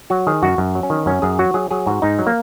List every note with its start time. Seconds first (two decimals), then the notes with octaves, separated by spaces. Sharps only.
0.10 F#3 F#4
0.27 D#3 G#4
0.43 F#2 F#4
0.58 F#2
0.75 F#3
0.83 C#4
0.90 D#3
1.06 F#2 C#4
1.22 F#2 G#4
1.39 F#3 F#4
1.54 F#3 G#4
1.71 F#3 G#4
1.87 G#2 F#4
2.02 G#2 D#4
2.19 F#3
2.27 A#3